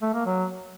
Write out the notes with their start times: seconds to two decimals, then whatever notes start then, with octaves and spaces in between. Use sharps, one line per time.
0.02 A3
0.14 A#3
0.25 F#3